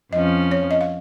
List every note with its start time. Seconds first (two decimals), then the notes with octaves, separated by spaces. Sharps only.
0.12 F2 F3 C#4 D#5
0.51 C#5
0.71 D#5
0.81 F5